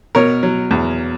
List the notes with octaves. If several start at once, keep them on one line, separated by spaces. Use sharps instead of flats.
B2 A#4 C#5
F#3
E2